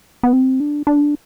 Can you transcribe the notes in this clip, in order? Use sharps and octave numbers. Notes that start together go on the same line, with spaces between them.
B3
C4
D4
D4